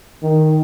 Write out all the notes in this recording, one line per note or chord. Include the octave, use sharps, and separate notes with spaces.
D#3